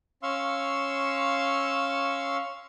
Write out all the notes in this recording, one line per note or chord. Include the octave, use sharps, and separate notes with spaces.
C#4 F5 C6 C#6 E6